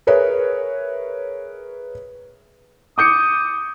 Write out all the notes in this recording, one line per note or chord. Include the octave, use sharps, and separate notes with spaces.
G#4 A#4 B4 C#5 E5
D6 D#6 G6 C#7